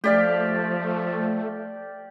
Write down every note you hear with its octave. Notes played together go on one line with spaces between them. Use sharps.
F3 A3 G4 D5 F5